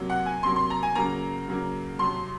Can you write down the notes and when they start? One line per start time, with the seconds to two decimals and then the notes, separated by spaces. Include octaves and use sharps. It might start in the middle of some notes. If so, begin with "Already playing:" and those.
Already playing: C3 F#3 A#3
0.10 F#5
0.26 G#5
0.43 C3 F#3 A#3 C6
0.56 C6
0.70 A#5
0.83 G#5
0.95 C#3 F#3 A#3 A#5
1.48 C#3 F#3 A#3
1.99 F2 C3 F#3 C6